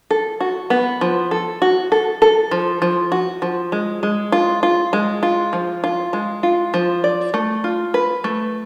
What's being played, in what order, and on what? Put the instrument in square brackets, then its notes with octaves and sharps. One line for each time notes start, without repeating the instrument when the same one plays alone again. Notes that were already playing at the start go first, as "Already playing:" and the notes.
[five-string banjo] A4
F#4
B3
F3
A4
F#4
A4
A4
F3
F3
F#4
F3
G#3
G#3
F4
F4
G#3
F4
F3
F4
G#3
F4
F3
D5
A3
F4
B4
A3